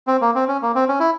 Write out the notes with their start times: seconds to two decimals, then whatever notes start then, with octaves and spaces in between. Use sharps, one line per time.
0.07 C4
0.21 A#3
0.35 C4
0.48 C#4
0.62 A#3
0.75 C4
0.88 C#4
1.00 E4